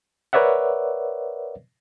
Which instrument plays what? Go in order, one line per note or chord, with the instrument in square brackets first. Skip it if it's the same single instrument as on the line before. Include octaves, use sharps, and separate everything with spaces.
[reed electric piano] A#4 B4 C#5 D5 E5 F#5